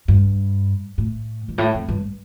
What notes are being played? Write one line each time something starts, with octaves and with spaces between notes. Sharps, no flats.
G2
A2
G2
A2
F2
G2